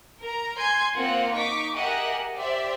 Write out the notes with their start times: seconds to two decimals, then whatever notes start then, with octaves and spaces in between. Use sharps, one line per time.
0.22 A#4 A#5
0.57 G#5 C6 G6 G#6
0.97 A#3 C4 F4 F5 F#5
1.34 D#4 C#6 D6 B6
1.75 G4 G#4 A#4 D#5 E5 F#5
2.35 G4 C5 D5 E5